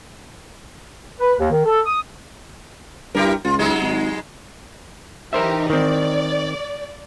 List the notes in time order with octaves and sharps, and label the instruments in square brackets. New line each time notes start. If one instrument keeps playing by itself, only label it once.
[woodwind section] B4
D#2
D#3
A4
D#6
[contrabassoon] G2 [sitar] E4 G4 A#4
[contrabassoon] C#2 [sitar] F4
[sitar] F#3 G#3 D#4
[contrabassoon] G#1
[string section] E3 D#4 G4 [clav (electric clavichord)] A#4 C5 E5
[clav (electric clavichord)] D#3 C4 [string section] D5